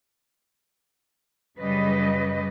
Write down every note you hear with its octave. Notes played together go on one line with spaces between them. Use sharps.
F#2 C#3 G3 B4 D#5